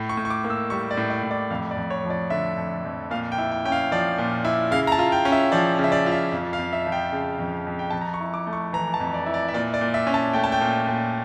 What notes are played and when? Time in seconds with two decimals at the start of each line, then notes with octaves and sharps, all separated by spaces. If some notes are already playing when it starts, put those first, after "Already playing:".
Already playing: A2
0.09 C#6
0.17 A2
0.25 C#6
0.30 D6
0.44 A#3
0.50 E6
0.70 G3 C#6
0.91 D5
0.97 A2
1.10 D5
1.23 A2
1.31 D5
1.50 F2 F5
1.71 D5
1.77 F2
1.90 C#5
2.04 F3
2.10 D5
2.30 D3 E5
2.57 F2
2.85 F2
3.11 A#2 F5
3.32 G5
3.38 E4
3.51 G5
3.65 C#4 G5
3.72 F5
3.92 F3 D5
4.18 A#2
4.45 E4
4.71 C#3 F5
4.87 A#5
4.92 A5
4.99 F4
5.12 G5
5.25 C#4
5.32 E5
5.52 F3 D5
5.79 C#3
5.84 E5
5.92 D5
6.06 F4
6.12 E5
6.32 F2
6.53 F5
6.59 F2
6.73 E5
6.86 F3
6.92 G5
7.12 C#3
7.39 F2
7.67 F2
7.79 G5
7.90 F2 A5
8.01 A#5
8.14 C#6
8.20 E4
8.34 D6
8.47 A3
8.53 C#6
8.73 E3 A#5
8.94 A5
9.00 F2
9.14 D5
9.26 E4
9.34 D5
9.48 E5
9.54 A#2 D5
9.74 D5
9.81 A#2
9.94 E5
10.07 C#4
10.14 A5
10.33 A3 G5
10.44 A5
10.52 G5
10.61 A#2
10.87 A#2